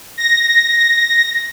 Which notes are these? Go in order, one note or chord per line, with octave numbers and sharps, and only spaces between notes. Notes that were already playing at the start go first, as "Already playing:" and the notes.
A#6